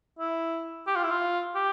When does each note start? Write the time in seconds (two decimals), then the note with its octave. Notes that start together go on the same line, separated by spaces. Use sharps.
0.19 E4
0.87 G4
0.95 F4
1.03 E4
1.10 F4
1.55 G4